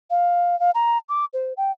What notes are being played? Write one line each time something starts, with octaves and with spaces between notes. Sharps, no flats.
F5
F5
A#5
D6
C5
G5